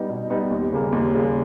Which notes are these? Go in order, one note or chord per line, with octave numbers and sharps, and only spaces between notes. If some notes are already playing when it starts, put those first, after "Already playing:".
Already playing: G3 B3 D#4
B2
G3 B3 D#4
D#2
C#3 G3 A#3
D#2
C#3 G3 A#3